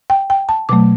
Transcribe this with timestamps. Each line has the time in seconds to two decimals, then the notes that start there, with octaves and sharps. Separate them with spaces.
0.10 G5
0.30 G5
0.49 A5
0.69 B2 F#3 A3 D6